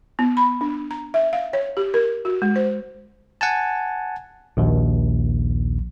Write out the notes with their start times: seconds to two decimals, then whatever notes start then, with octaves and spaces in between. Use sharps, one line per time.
0.19 B3
0.37 B5
0.61 D4
0.91 A#5
1.14 E5
1.33 F5
1.53 C#5
1.77 G4
1.94 A#4
2.25 F#4
2.42 G#3
2.56 C5
3.41 F#5 G#5 A5
4.57 A#1 D#2